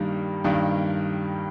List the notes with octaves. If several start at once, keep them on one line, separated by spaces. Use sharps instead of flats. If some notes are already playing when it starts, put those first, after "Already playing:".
Already playing: G2 D#3 G3 A#3
G2 D#3 G3 A#3